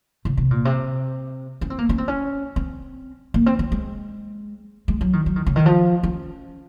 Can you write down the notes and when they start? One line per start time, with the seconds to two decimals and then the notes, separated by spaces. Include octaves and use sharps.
0.25 C#3
0.37 C3
0.51 A#2
0.65 C3
1.61 C#4
1.70 C4
1.78 A#3
1.89 C#4
1.98 C4
2.08 C#4
2.56 C4
3.34 A#3
3.46 C4
3.59 C#4
3.72 G#3
4.88 G#3
5.01 F#3
5.13 D#3
5.26 F#3
5.36 D#3
5.47 C#3
5.56 D#3
5.66 F3
6.03 C#4